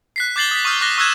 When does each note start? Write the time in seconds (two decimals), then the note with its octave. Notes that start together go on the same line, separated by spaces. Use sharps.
0.16 F#6 B6 C7
0.36 D6 G6 A6 C7 F#7 G7
0.51 D#6 B6
0.65 C#6 D#6 F6 G6
0.81 D6 F#6 A#6
0.98 C#6 E6 F#6 G#6 E7